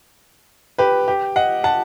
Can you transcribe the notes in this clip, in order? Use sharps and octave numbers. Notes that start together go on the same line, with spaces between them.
G4 B4
G4
D#5 F#5
F#5 A5